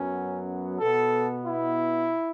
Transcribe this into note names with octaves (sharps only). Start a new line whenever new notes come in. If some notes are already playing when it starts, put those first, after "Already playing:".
Already playing: F#2 F#3 B3 C#4
B2 B3 A4
E4